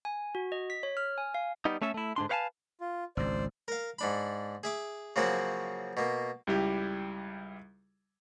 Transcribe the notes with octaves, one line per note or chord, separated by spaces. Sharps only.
G#5
F#4
D#5
B6
C#5
F6
G#5
F5
G3 B3 D#4
A3 C#4 A4 E5
A3 E4
G#2 D3 D4 C6
B4 C5 F5 F#5 G#5 A5
F4
G#1 C#2 C5 D5
A#4 F5
G#2 D4 B5
G#4 E5 D6
C#3 F3 F#3 A#3 C4 F#4
B2 A#3
C#2 G3 E4 G4